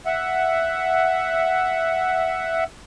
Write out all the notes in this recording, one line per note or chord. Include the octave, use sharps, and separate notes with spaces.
E5 F#5